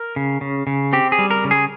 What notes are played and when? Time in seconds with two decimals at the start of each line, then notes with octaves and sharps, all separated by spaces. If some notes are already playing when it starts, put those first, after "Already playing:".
Already playing: A#4
0.16 C#3
0.41 C#3
0.67 C#3
0.93 C4 G4
1.12 G#4
1.19 G3
1.31 A#4
1.44 C#3
1.51 G#4